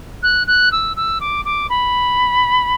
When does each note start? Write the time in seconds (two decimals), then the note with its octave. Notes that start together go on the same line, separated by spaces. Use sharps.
0.23 F#6
0.47 F#6
0.72 E6
0.96 E6
1.21 D6
1.45 D6
1.70 B5